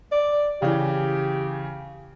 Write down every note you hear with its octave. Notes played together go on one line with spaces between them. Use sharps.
D5
C#3 E3 G4